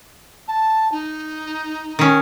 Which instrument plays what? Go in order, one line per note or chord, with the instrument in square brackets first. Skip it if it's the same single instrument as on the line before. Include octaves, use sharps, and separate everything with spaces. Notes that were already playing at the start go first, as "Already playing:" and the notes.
[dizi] A5
D#4
[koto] D#3 C#4